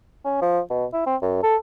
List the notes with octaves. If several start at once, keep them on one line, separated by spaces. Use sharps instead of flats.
C#4
F3
B2
E4
C4
F#2
A4